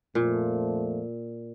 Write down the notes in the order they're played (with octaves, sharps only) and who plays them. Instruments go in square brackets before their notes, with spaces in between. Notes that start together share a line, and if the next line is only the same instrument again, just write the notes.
[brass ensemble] F2 F3 A3 [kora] A#2